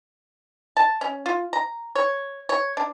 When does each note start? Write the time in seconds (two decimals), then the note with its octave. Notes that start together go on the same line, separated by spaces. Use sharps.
0.77 A5
1.01 C#4
1.26 F4
1.53 A#5
1.95 C#5
2.49 C#5
2.77 D4